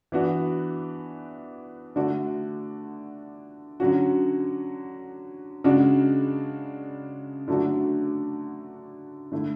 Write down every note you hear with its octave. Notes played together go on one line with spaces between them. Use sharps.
E3 B3 D4 F#4
D3 A3 D4 F#4
D3 F#3 C#4 F#4
C#3 G#3 D4 F#4
D3 F#3 A3 D4 F#4
D3 A3 E4